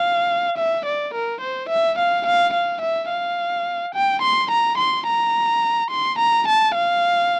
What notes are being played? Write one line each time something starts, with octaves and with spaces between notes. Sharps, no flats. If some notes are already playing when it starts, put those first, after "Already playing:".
Already playing: F5
E5
D5
A#4
C5
E5
F5
F5
F5
E5
F5
G5
C6
A#5
C6
A#5
C6
A#5
A5
F5